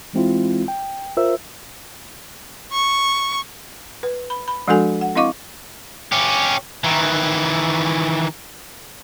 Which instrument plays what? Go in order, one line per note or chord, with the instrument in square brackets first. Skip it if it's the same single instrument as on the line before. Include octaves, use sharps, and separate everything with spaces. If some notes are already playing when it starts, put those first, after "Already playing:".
[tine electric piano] E3 G#3 C4 E4 F4
G5
F4 A#4 C5 E5 E6
[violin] C#6
[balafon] B4
B5
B5
F3 G#3 D4 F#4 A4 G#5
F#5
C4 E4 D#5 F5 C#6 D6
[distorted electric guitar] C#4 G4
D#3 E3